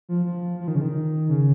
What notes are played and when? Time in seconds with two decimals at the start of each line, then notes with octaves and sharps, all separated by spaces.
0.09 F3
0.26 F3
0.60 F3
0.68 D#3
0.75 C#3
0.81 D#3
1.29 C#3